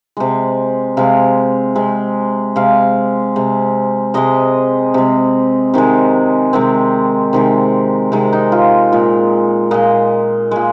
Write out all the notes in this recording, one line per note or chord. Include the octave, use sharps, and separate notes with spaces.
C3 G#3
C3 G#3 F5
C3 G#3
C3 G#3 F5
C3 G#3
C3 G#3 D#5
C3 G#3
C3 D#3 G#3
C3 D#3 G#3 C4
C3 D#3 G#3
C3 D#3 G#3
D#4
F4
A#2 G#3
A#2 G#3 D#5
A#2 G#3